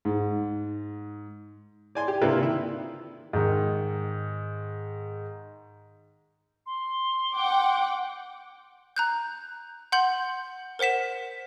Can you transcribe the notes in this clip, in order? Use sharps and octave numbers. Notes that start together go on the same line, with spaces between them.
G#2
D5 G#5 C6
G4
C3 A#3 D4 E4 F4 B4
D#3 E4
G#2 D#3
C6
F#5 G5 D6
A#5 F#6 G6
F#5 C6 G6 F#7
A#4 C5 F#5 B6 E7